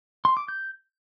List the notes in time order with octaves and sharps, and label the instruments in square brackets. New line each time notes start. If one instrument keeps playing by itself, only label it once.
[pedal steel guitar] C6
D6
G6